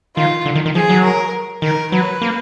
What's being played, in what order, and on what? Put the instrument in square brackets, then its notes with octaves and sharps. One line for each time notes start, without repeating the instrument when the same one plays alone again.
[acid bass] D#3 [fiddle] F4
[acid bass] D3
D#3
D#3
[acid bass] F3 [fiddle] G#4
[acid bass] F#3
[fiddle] A#4
[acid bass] D#3 [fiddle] A#4
[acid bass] F#3 [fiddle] B4
[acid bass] A#3